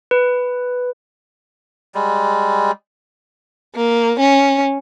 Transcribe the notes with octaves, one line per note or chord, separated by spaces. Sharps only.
B4
G3 G#3
A#3
C#4